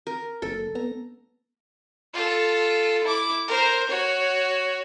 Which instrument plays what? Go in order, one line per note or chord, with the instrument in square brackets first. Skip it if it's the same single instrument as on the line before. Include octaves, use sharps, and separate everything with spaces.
[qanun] A#4
[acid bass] F#1 [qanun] A4
[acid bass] B3 [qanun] A#5
[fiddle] F4 A4
E4 D6
A#4 C5
F#4 C#5